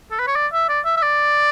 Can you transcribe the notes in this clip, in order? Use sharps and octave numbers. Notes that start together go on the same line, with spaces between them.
A4
B4
C#5
D5
E5
D5
E5
E5
D5